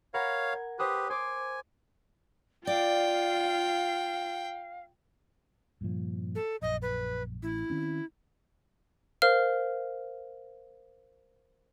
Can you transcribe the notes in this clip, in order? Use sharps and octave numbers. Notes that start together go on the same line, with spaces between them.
A#4 C#5 F5 F#5 B5
G#6
G4 B4 C5 D#6 F#6
C5 G#5 D6
F4 D5 F5 G5
G2 A#2 F3
A4
A#1 F#2 D#5
B4
A1 E4
D#3 C4 C#4
A#4 C5 F5 F6